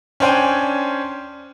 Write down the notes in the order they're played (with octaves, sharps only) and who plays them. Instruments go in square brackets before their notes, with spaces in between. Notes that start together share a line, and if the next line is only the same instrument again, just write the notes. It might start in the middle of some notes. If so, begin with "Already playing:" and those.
[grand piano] C#4 D4 C5 G5 G#5